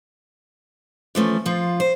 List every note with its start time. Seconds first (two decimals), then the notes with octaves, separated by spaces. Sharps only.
1.15 E3 F3 A3 C#4
1.46 F3 F4
1.80 C5